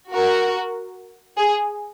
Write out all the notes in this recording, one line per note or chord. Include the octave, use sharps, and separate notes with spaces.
F#4 A#4
G#4